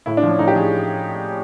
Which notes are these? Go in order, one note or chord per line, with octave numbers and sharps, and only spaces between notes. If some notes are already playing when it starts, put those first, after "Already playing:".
A2 E4
D4
F3 C#4
A2 D#4
G4
F3 G#4